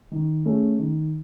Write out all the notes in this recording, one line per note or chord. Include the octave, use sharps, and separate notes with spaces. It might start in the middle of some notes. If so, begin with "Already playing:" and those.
D#3
A3 C#4 G#4
D#3